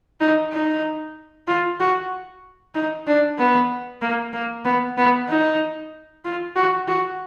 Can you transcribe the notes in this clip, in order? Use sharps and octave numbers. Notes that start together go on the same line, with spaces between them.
D#4
D#4
F4
F#4
D#4
D4
B3
A#3
A#3
B3
B3
D#4
F4
F#4
F#4